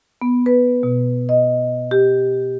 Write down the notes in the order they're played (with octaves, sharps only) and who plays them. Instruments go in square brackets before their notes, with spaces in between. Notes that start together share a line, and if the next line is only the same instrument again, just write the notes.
[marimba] B3
B4
B2
D#5
G4